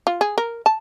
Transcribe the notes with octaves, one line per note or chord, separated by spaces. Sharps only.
F4
G#4
A#4
A5